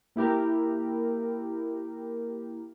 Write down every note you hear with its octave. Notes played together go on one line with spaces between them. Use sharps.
A#3 E4 G4 A#4